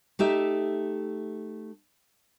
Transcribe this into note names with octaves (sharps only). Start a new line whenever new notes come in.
A3 D#4 G4 E5